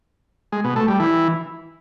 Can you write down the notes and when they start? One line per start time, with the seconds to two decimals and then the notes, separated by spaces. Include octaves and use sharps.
0.52 G#3
0.64 B2
0.76 A3
0.88 G3
1.00 E3